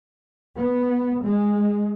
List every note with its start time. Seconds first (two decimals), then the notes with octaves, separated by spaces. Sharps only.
0.59 B3
1.24 G#3